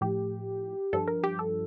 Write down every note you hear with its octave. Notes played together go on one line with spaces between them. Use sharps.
A2 F3 G4
G2 F3 A4
A#4
G4
A4